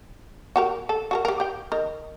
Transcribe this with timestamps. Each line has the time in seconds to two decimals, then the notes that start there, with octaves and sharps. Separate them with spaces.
0.56 F#4 G4 A#4
0.89 A4
1.11 F#4 A4 A#4
1.25 G4 A#4
1.40 G4 G5
1.72 D#3 A#4